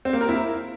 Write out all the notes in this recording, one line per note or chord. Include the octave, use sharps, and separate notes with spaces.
C4
A#3
A#4
E4